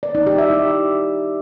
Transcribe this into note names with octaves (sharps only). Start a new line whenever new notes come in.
D5
D#4
G4
E5
E4